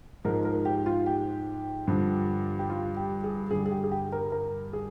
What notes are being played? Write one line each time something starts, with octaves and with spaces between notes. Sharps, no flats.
G#2 F3 G#3 A#4
A#4
G4
F4
G4
G2 D3 F3
G4
F4
G4
G#4
G2 D3 G3 G#4
G#4
G4
G#4
G4
A#4
A#4
G#4